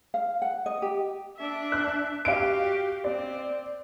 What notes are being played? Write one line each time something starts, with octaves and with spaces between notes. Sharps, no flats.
F5
F#5
D#5
G4
D4 E5
F#6
F#4 G4 F5 D7
C4 D5